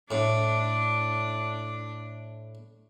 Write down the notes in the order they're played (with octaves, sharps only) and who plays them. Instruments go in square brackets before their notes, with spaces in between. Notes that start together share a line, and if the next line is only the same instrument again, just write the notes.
[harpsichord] A2 [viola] D4